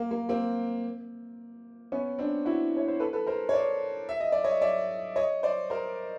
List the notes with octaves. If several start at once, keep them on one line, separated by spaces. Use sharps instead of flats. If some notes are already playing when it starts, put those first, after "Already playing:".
Already playing: A#3
A#3
A#3 C4
B3 C#4
C4 D4
E4 F#4
C#5
C5
A4 B4
A4 B4
A#4 C5
C#5
C5 D5
E5
D#5
D5
C#5 D#5
D5 E5
C#5 D#5
C5 D5
A#4 C5